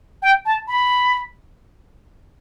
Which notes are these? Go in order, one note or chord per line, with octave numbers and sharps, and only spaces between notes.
G5
A5
B5